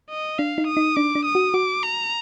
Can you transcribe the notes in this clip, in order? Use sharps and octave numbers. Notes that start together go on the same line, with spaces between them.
D#5
D4 F5
D#4
D#6
D#4
D4 D6
D4
D#6
F#4
F#4 D6
A#5